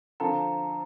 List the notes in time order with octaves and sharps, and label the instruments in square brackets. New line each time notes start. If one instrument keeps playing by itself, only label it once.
[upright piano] D3 F3 C4 F4 A4 [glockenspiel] A#5